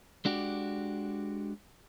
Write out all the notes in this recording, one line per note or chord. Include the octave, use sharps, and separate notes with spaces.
G#3 D4 F#4 G4